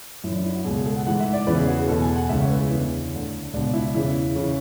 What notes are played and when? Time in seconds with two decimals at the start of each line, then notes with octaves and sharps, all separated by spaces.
0.24 F#2 E4
0.28 E3
0.34 D4
0.44 E4
0.55 F#4
0.64 B2 G#4
0.68 C#2
0.76 G#4
0.86 A4
0.96 F#5
1.06 G#2 E3 F#5
1.20 E5
1.33 D5
1.47 E2 C#3 E3 B4
1.58 G#4
1.68 F#4
1.78 G#4
1.88 E2 B2 A4
2.02 G#5
2.16 F#5
2.29 C#2 C#3 E3 E5
2.40 C#5
2.50 B4
2.61 G#4
2.71 E2 D3 E4
3.13 D2 D3
3.53 C#2 B2 D4
3.74 E4
3.94 E2 C#3 E3 E4
4.36 C#3 E3